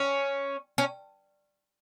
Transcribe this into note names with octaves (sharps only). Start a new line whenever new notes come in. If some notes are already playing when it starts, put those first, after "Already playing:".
Already playing: C#4
C#4